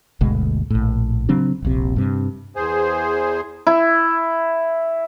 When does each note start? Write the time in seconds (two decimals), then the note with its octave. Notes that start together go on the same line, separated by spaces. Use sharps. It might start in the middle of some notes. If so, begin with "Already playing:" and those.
0.21 G1 D2 B2 G#3
0.70 A#1 A2
1.29 C#3 F#3 C4 D4
1.62 D#1 A#1 C3
1.96 G2 C3
2.56 E2 G#4 C5
3.67 E4